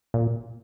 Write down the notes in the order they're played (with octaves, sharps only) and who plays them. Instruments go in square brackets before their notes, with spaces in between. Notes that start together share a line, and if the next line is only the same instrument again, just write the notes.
[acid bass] A#2